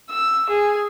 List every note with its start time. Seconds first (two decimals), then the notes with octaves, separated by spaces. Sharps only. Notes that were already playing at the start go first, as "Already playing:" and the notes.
0.10 E6
0.49 G#4